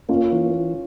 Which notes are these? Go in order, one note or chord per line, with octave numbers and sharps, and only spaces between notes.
A#3 C#4 F4
E3